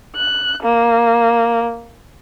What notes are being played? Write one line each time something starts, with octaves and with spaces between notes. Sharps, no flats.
F#6
A#3